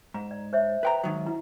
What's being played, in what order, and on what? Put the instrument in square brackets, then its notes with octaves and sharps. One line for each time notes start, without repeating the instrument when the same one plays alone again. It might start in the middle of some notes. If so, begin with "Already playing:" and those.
[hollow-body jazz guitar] G#2 [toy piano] A#5
[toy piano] D5
C5 C#5 E5
[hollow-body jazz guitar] B4 G5 A#5
G#2 D#3 F#3
[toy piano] E4